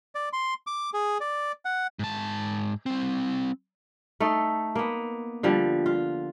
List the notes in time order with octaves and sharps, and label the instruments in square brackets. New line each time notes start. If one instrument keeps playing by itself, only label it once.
[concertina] D5
C6
D6
G#4
D5
F#5
[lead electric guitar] G#2 A5
G3 C4
[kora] A3 D#4 A4
A#3 B3
D3 F3 G3
F4